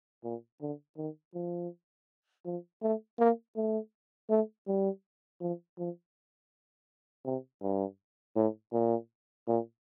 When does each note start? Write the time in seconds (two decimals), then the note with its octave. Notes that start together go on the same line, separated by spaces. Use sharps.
0.24 A#2
0.61 D3
0.97 D#3
1.35 F3
2.46 F3
2.82 A3
3.19 A#3
3.56 A3
4.30 A3
4.67 G3
5.41 F3
5.78 F3
7.25 C3
7.62 G2
8.36 A2
8.73 A#2
9.47 A#2